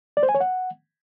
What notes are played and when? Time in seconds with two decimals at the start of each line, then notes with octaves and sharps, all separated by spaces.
0.17 D5
0.23 C5
0.29 G#5
0.35 C#5
0.40 F#5